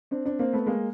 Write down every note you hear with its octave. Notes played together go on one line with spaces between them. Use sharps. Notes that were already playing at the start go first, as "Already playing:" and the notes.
C4 D4
C4 D4
A#3 C4
A3 B3
G#3 A#3